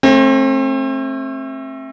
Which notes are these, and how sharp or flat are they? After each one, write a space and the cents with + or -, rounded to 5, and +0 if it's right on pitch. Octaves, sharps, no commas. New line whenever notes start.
A3 +0 C4 +35